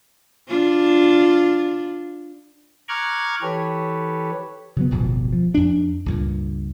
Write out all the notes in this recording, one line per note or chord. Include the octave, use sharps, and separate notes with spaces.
D4 F4
A#5 C#6 D6 F6 F#6 G#6
E3 G4 A4 B4 C#5
C#3 F#3 B3
D1 G1 F2 B2
F3
F2 D4
C#2 G2 A#2